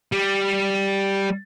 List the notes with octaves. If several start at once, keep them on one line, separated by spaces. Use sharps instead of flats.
G3